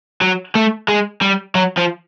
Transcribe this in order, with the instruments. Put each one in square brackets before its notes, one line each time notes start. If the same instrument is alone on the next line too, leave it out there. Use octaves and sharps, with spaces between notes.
[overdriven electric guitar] F#3
A3
G#3
G3
F#3
F3